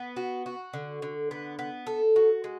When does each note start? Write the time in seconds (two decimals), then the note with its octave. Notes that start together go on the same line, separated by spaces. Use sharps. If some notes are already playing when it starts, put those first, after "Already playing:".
Already playing: B3
0.17 F#4
0.46 F#4
0.73 D3
1.02 D3
1.31 B3
1.59 B3
1.87 A4
2.16 F#4
2.44 G#3